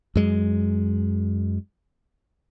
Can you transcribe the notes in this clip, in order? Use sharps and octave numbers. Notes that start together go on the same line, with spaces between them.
F#2 G#3